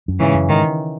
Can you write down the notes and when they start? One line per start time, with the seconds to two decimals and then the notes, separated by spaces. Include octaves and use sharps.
0.08 F#2
0.19 G#2 C#3 E3
0.34 F#2
0.48 G#2 D#3